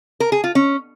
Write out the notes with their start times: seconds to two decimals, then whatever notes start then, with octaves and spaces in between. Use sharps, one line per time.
0.20 A#4
0.32 G#4
0.44 F4
0.55 C#4